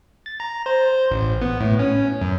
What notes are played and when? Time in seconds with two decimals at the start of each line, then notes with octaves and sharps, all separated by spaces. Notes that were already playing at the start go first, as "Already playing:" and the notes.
0.26 A6
0.40 A#5
0.66 C5
1.11 A1
1.42 B3
1.60 A2
1.79 C#4
2.21 F#2